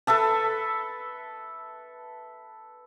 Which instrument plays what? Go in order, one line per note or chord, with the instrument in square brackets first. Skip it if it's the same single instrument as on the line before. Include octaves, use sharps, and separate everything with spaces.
[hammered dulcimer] A4 B4 E5 A5